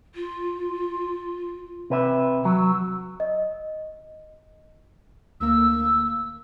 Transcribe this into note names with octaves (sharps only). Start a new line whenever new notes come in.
F4
C3 B4 E5
F#3 E6
D#5
D2 A#3 E6